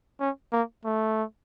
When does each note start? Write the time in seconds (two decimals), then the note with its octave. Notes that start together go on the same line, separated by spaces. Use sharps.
0.20 C#4
0.52 A#3
0.85 A3